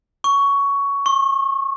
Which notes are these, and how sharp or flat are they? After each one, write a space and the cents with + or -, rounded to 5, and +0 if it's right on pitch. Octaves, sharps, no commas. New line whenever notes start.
C#6 +15
C#6 -35